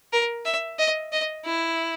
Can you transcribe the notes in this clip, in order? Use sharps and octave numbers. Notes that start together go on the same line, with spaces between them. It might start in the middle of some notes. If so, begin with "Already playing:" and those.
A#4
E5
D#5
D#5
E4